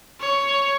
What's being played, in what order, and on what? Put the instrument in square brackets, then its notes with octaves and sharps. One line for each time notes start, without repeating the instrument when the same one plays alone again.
[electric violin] C#5